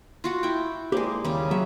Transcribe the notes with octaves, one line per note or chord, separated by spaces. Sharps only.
F4 F#4 F#5
E4 G5
G#3 A#3 G4 C5 D5
D#2 C#3 G3
F#3 E5